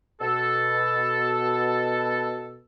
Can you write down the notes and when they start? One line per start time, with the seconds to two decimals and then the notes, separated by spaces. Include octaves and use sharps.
0.21 B2 A4